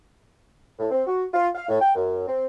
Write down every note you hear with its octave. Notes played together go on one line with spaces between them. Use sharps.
A2
C4
F#4
F4
F5
A2
G5
F#2
C4